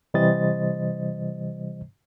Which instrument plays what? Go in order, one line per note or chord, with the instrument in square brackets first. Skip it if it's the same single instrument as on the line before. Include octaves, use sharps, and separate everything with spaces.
[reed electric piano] C3 E3 G3 C5 D#5 A6